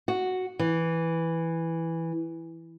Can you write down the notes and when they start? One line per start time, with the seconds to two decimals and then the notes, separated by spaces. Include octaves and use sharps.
0.08 F#4
0.59 E3